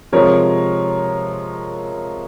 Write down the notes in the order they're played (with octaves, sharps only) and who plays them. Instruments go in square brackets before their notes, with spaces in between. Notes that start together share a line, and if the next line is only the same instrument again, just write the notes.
[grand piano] C3 F3 G#3 A#4 C#5